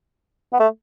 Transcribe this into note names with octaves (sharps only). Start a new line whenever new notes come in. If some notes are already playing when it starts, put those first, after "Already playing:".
B3
A3